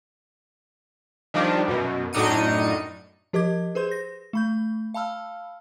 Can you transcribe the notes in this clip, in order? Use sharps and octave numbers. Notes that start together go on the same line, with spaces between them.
D#3 F3 G3 D4
F#2 B2
F#2 A2 D4 D#4 C#7 D#7
F3 G4 A#4 D#5 D6 G#6
G#4 B4 C5 C6 G6
A#6
A3 B5 G6
F5 A5 B5 E6 F6